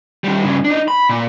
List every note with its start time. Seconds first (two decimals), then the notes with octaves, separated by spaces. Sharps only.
0.24 D#3 G3
0.44 G2 C#3
0.65 D4 D#4
0.88 B5
1.09 A#2